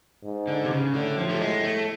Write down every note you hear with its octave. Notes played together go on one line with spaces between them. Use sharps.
G#2
D3
C3
C#3
A2 D3
F3
A3
G#3
A3